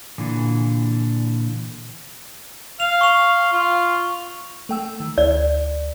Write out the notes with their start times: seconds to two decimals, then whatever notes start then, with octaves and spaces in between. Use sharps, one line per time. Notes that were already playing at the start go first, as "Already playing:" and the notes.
0.18 A#2 D3 E3
2.80 F5 F7
3.01 C#6 F7
3.53 F4
4.69 A3 G5 E6
5.00 D#3
5.18 D2 D5